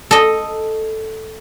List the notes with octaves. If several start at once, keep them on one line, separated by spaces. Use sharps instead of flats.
A4 D#5